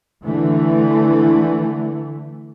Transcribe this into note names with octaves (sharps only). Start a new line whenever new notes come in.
D3 E3 A3